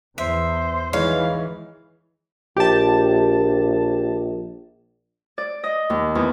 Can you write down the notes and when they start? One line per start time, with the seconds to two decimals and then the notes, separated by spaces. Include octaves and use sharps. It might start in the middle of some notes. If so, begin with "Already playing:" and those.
0.18 E2 C5 E5
0.93 E3 G#3 D#4 C#5 F5
2.57 A#1 G4 A5
5.38 D5
5.64 D#5
5.90 D#2
6.15 E2